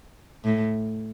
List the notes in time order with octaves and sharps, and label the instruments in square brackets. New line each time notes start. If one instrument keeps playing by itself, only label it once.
[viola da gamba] A2